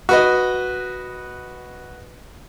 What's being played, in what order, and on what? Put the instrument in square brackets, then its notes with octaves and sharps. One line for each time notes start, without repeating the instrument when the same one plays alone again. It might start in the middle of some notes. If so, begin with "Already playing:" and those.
[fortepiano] F#4 B4 D#5